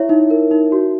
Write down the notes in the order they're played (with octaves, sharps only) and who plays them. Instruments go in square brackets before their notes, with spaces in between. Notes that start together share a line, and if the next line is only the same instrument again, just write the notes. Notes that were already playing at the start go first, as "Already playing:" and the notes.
Already playing: [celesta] E4 C#5 E5
D#4
A#4
D#4
F#4